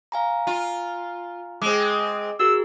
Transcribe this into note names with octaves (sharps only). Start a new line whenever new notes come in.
F5 G#5 A#5
F4
G#3 C4 D6
F#4 G#4 A#4 E6